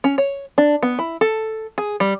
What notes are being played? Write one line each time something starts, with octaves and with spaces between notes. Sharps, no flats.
C#4
C#5
D4
B3
E4
A4
G#4
G3